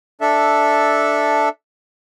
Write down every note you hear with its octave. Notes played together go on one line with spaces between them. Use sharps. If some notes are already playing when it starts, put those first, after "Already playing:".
D4 A4 E5